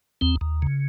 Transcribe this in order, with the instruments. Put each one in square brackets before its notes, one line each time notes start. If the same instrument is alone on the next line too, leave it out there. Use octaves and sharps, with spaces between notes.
[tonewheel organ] D#2 C4
D#2
C#3